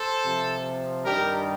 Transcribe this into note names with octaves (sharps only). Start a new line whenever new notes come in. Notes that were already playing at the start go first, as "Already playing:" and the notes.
Already playing: A4 C5
C3 F3
G2 D#3 G3 G4 A#4